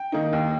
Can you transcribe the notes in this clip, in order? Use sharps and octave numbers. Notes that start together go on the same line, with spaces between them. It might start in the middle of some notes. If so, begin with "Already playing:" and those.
Already playing: G5
D#3 A#3 D#4
D#2